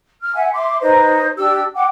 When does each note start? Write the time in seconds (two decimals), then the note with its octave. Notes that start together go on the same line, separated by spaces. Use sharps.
0.21 F6
0.34 E5 F#5 G#5
0.53 E5 C6 D6
0.81 D#4 B4 C5 D#5
1.37 D4 G4 E6
1.74 F#5 G5 D6